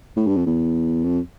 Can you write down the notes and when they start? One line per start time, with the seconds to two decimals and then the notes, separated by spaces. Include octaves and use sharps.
0.17 A2
0.27 G2
0.37 F2
0.46 E2
1.04 F2